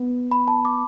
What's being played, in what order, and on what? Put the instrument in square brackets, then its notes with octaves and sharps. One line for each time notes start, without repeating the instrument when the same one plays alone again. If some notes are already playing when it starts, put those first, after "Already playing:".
Already playing: [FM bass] B3
[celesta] B5
A5
D6